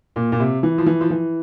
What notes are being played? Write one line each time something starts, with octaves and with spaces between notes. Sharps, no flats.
A#2
A#2
C3
E3
F3
E3
F3
E3